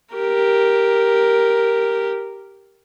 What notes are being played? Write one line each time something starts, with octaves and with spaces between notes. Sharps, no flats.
G4 A#4